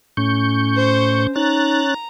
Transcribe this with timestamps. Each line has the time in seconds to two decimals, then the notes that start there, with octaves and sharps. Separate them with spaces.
0.17 A2 C#4 C#6 G6
0.76 C5
1.36 C#4 D#4 A#5 F#6 A6